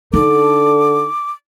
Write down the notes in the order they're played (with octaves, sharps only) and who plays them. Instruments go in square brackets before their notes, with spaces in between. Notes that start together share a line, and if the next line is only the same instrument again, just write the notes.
[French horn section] D3 A4 [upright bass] D#4 [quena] D6